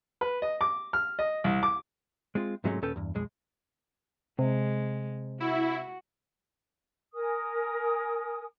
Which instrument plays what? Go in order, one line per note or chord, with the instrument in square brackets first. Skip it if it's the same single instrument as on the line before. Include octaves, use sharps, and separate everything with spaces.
[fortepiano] B4
D#5
D6
F6
D#5
C2
D6
[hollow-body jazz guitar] G#3 C4 F4
G#2 C3 F#3 G#3 A3 C#4
D#2 A#2 C#4 A4 B4 G5
E2 G2
B1 F2 G#3
[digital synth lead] C3 [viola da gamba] G#3
[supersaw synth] E4 [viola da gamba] F#4
[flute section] A#4 G#5 D#6